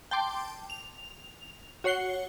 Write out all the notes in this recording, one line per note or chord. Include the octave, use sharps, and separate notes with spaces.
G5 A5 C6 D6
F7
F#4 C#5 F#5 C7 C#7 G7